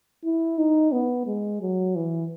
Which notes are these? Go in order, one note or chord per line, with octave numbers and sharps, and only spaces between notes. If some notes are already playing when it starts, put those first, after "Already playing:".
E4
D#4
B3
G#3
F#3
E3